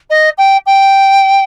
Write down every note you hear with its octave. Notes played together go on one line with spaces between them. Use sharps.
D#5
G5
G5